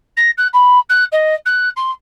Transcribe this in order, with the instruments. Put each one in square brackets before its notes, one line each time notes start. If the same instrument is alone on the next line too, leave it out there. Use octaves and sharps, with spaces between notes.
[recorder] A#6
F#6
B5
F#6
D#5
F#6
C6